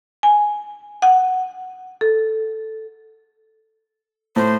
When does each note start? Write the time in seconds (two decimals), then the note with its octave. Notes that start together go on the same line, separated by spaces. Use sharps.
0.23 G#5
1.02 F#5
2.01 A4
4.36 A2 C5